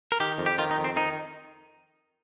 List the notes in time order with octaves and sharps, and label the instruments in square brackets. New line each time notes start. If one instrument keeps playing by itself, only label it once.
[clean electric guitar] A#4
D#3 G4
F2
G4
D#3 F4
D#4
F2
C4
D#3 D#4